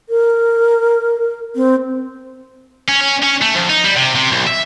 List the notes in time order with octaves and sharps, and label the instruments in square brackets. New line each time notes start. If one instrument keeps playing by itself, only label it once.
[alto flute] A#4
C4
[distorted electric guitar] C#4
C#4
C#4
A3
F2
D#4
G3
C3
C3
B1
E5